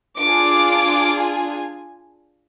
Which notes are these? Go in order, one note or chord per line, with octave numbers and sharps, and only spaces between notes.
D4 F4 G#4 D6
G#5